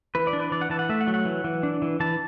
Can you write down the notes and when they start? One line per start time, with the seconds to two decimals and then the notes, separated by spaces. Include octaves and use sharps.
0.15 E3 B4
0.27 D5
0.33 D4
0.40 B4
0.52 E3 D5
0.61 F#5
0.70 E3 A5
0.79 F#5
0.89 A3 E5
1.01 F#5
1.07 F#3
1.14 F#5
1.25 E3
1.44 E3
1.63 D4
1.82 E3
2.00 E3 A5